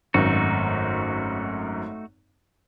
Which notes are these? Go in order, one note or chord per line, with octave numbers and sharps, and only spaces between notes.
G#1 F#2 A3 D#4 F#4